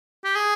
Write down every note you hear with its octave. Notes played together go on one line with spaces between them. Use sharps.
G4
G#4